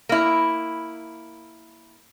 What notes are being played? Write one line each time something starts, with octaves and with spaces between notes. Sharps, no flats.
A#3 E4